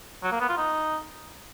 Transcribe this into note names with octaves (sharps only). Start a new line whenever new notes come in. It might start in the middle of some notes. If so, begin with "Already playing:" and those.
F#3
A#3
B3
F4
D#4